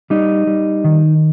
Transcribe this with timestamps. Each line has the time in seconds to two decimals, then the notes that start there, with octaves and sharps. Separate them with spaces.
0.10 G3 D#4
0.47 G3
0.84 D#3